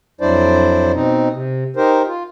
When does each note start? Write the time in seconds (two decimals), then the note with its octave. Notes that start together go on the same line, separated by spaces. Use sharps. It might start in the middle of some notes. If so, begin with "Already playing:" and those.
0.21 F2 F#3 D4 E4 C5 D5
0.94 B2 C4 D#4
1.31 C3
1.76 D#4 G4 A#4 C5
2.07 F4